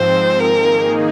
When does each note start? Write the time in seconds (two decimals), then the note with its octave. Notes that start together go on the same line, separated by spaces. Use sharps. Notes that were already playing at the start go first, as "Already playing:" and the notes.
Already playing: G#2 F3 C4 C5
0.40 D#3 A#3 D#4 G#4 A#4